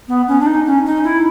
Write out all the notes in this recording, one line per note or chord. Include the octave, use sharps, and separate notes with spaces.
B3
C#4
D4
D#4
C#4
D#4
E4